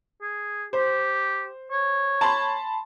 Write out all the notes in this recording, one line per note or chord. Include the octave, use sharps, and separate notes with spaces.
G#4
G4 C5
C#5
A5 B5 C6